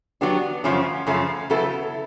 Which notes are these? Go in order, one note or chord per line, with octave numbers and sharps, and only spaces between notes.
F#3 B3 D4 G4
F#2 C#3 F3 A3 C#4
F#2 C#3 F3 A3 C#4
C#3 F#3 B3 E4 A4